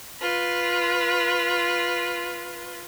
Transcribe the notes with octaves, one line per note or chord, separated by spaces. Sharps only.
F4 B4